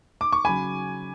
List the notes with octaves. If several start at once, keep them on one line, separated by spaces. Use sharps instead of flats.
D6
C#6
C#3 F#3 G#5 B5